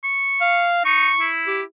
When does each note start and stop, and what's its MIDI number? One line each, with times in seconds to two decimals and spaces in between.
0.04 0.66 85
0.41 0.81 77
0.85 1.10 63
0.85 1.27 85
1.20 1.62 64
1.47 1.63 67